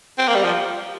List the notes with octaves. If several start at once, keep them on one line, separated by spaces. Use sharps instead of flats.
C4
A#3
G3
F3